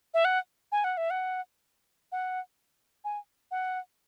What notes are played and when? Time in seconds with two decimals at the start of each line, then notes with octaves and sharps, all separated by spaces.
0.14 E5
0.25 F#5
0.72 G#5
0.84 F#5
0.97 E5
1.10 F#5
2.12 F#5
3.05 G#5
3.51 F#5